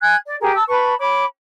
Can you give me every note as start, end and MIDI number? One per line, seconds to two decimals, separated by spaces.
0.01 0.16 80
0.01 0.16 90
0.01 0.16 92
0.26 0.35 74
0.39 0.53 67
0.39 0.53 68
0.39 0.53 70
0.53 0.62 81
0.53 0.62 88
0.68 0.92 71
0.68 0.92 81
0.68 0.92 83
0.68 0.92 85
0.98 1.22 73
0.98 1.22 83
0.98 1.22 86